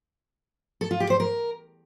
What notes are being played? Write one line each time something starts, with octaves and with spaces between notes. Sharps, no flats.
A4
F4
G4
C5
A#4